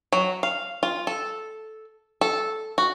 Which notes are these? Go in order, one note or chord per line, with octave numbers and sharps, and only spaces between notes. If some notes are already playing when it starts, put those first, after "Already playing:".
F#3
F5
F4
A4
A4
F#4